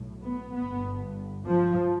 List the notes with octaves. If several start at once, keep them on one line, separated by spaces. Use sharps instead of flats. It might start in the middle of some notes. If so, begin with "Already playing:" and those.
Already playing: B1 A2
B3
G1 G2 B3
F3